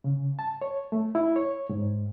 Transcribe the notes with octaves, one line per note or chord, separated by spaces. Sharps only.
C#3
A5
C#5
A3
E4
C#5
G#2